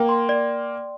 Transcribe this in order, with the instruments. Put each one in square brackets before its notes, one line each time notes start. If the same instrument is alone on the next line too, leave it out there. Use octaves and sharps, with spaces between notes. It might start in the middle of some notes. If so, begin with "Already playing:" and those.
Already playing: [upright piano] A#3 [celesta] G5
[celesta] C6
D5